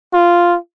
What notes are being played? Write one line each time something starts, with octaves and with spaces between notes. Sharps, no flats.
F4